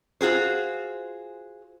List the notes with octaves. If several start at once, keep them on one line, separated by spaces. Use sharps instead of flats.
F4 F#4 G#4 C5